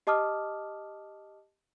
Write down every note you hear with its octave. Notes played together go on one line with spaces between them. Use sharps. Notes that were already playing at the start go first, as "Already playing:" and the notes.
G4 D#5 A5 D6 D#6 F6